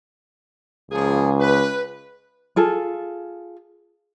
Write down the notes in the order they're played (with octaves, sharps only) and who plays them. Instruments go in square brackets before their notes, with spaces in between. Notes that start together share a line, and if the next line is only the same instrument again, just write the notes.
[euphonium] C#2 [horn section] F3 A#3 G#4
[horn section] B4
[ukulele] F4 G#4 A4